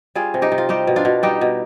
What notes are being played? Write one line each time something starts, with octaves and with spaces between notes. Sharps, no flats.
G3 F4 G#4
C3
D#4 G4
C3
F4
G3 D#4 G4
B2
D4 F4
B2
G3 D#4 G4
B2